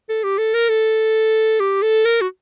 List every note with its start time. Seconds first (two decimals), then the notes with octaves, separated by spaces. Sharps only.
0.09 A4
0.24 G4
0.38 A4
0.54 A#4
0.69 A4
1.60 G4
1.82 A4
2.05 A#4
2.21 F#4